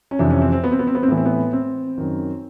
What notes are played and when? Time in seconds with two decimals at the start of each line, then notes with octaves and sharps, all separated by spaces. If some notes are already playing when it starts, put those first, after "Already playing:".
0.11 C#4
0.19 F2 C3 E3 D4
0.30 C#4
0.42 C4
0.52 C4
0.64 B3
0.72 C4
0.79 B3
0.87 C4
0.95 B3
1.03 C4
1.08 A2 E3 B3
1.17 C4
1.26 B3
1.53 C4
1.98 F#2 D#3